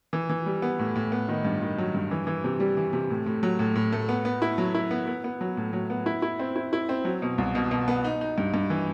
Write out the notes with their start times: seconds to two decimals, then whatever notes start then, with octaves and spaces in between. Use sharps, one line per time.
0.13 E3
0.29 E3
0.46 G3
0.62 B3
0.79 A2
0.96 A2
1.12 B3
1.29 D#3
1.45 G2
1.62 D#3
1.78 F#3
1.95 G2
2.11 E3
2.27 E3
2.44 C3
2.60 G3
2.77 E3
2.93 C3
3.10 A2
3.26 A2
3.43 F#3
3.59 A2
3.76 A2
3.92 A3
4.09 B3
4.25 B3
4.42 E4
4.58 F#3
4.75 E4
4.91 B3
5.07 B3
5.24 B3
5.41 F#3
5.57 A2
5.73 F#3
5.90 B3
6.06 E4
6.22 E4
6.39 C4
6.56 E4
6.73 E4
6.89 C4
7.05 F#3
7.22 B2
7.38 C2
7.55 B2
7.71 B2
7.88 B3
8.04 D#4
8.21 D#4
8.38 G2
8.54 G2
8.70 E3